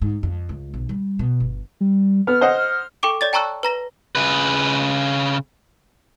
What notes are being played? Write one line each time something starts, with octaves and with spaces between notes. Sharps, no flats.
G#2
F2
C#2
B1
G3
B2
G1
G3
B3 F6
C5 D#5 F#5
A4 G5 C#6 D6 D7
C#5 D5 A6
G5 A5 A#5 C#6 E6 F#6
B4 A#5 A#6
C#3 B4